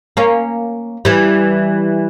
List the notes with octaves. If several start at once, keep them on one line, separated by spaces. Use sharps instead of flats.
A#3 C#4
E3 G3